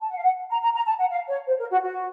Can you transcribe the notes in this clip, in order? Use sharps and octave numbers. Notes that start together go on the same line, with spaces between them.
A5
F#5
F5
F#5
A#5
A#5
A#5
A5
F#5
F5
C#5
C5
A#4
F#4
F#4